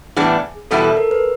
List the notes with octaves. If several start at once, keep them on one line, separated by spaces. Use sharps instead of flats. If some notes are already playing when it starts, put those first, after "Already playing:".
A2 E3 G3 B3 D4 G#4
E2 B2 G3 B3 E4 A4
A4
A#4
B4